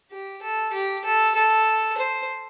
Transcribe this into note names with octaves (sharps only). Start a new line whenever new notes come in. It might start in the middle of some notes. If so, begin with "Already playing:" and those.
G4
A4
G4
A4
A4
C5